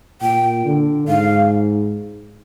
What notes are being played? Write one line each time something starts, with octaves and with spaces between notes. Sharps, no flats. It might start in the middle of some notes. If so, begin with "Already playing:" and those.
A#2 G5
D3
G#2 F5